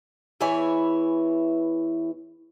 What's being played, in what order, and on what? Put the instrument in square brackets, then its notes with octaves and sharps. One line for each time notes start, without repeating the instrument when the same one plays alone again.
[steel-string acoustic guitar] E2 E3 E4 C#5 G#5